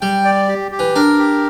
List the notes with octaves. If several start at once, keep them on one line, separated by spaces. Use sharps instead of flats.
G3 G5
D5
G4
G4
E3
D4 A#4
G4